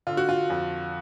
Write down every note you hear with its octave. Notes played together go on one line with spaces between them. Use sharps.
D3 F4
F#4
F4
F2